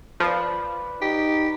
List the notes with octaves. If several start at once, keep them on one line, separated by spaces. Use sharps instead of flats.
F3 B4 D5
D#4 G4